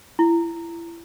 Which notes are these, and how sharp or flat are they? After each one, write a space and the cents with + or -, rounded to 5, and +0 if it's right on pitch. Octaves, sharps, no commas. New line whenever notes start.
E4 +30